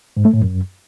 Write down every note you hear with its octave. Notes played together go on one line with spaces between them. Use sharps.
G#2
A3
A2
F#2